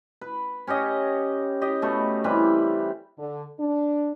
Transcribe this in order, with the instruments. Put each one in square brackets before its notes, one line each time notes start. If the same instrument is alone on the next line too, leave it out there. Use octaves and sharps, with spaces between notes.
[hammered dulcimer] B4
C#4 G4 C#5 D#5
G4 D#5
B2 A3
E3 G3 C4 B4
[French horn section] D3
D4